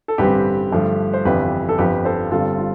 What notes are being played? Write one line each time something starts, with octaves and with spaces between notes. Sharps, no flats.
A4
A1 G2 D3 G3 C4 G4 B4
G2 D3 F3 A3
C5
G1 F2 E3 G4 B4
A4
G1 F2 D3 F3 G4 B4
A4 C5
G1 G2 D3 G3 C4 F4 A4
F4